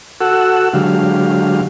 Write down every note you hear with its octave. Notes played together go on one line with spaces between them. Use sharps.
F#4 A4 F#5 E6
D3 F#3 G#3 G4 F5